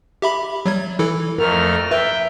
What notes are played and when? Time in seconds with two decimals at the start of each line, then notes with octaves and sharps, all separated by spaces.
0.22 G4 E5 B5
0.66 F#3 G3 G#6
0.99 E3 E4 A4
1.38 F2 A3 A#4 F6
1.91 B4 E5 G5